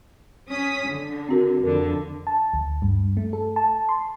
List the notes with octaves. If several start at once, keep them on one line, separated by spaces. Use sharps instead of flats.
C#4 D#6 B6
D3
C4 F#4 A#4
F2 D3 A#4
A5
D2
G2
A3
A4
A5
C6